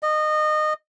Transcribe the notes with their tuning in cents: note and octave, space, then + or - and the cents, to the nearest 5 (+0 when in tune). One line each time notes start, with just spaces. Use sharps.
D#5 -25